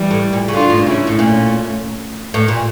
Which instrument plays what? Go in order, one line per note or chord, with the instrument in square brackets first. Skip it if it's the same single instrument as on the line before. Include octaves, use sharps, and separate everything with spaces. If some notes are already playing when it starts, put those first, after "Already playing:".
Already playing: [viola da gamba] E3 G3
[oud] A2
A#2
C#3
[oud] D3 [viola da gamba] D4 F4
[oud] A2
A#2
[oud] C#3 [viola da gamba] C#4 E4
[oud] A2
[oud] A#2 [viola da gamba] A3 C#4
[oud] A2
A#2